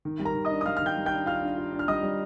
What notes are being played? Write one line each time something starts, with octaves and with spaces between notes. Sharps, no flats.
D#3
G3
A#4 A#5
D#3
D#5 D#6
D4
D#6
G3 F5 F6
F6
D#3 G5 G6
G3
G5 G6
D4
F4 F5 F6
D4
F4
D4
F6
G3 D#5 D#6
G3